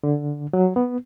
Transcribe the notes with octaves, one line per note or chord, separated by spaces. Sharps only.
D3
F#3
B3